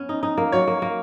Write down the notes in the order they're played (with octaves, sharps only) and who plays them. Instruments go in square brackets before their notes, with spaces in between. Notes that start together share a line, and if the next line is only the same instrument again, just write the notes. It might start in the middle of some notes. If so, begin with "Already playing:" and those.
Already playing: [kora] B3 C#4
D#4
D#4
A#3
[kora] F#3 [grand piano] C#5
[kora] A#3
A#3